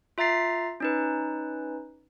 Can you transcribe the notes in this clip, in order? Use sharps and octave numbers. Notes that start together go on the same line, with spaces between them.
F4 E5 A#5 A6 C7
C#4 D#4 B4